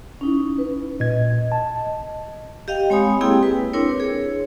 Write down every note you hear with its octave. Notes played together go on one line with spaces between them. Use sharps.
C#4 D#4 E4
B4
A#2 D#5 G#6
A5
G4 D#5 F5 G5
G#3 C4 C#5 G#5 B5 D#6
A#3 C4 E4 G4 G#4 G5
B4
C4 D4 E4 A#4 C#5
G#4 C#5